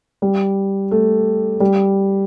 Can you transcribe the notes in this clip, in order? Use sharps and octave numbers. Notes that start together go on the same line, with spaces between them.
G3
A3
G3